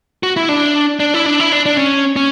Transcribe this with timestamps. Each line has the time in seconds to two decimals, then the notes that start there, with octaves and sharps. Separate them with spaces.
0.23 F#4
0.37 E4
0.49 D4
1.00 D4
1.14 E4
1.26 D4
1.40 E4
1.52 D4
1.66 D4
1.77 C#4
2.16 C#4